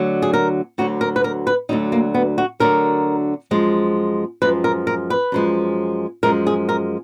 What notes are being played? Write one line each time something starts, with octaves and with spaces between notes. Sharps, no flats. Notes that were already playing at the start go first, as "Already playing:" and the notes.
Already playing: D2 D3 F#3
G#4
A#4
D2 D3 F#3 F#4
A#4
B4
A#4
B4
D2 D3 F#3 D#4
A#3
B3
F#4
D2 D3 F#3 A#4
F#2 F3 G#3
F#2 F3 G#3 B4
A#4
A#4
B4
F#2 F3 G#3
F#2 F3 G#3 A#4
G#4
A#4